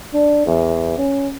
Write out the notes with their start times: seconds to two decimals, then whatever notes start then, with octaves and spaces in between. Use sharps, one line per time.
0.14 D4
0.46 E2
0.98 C#4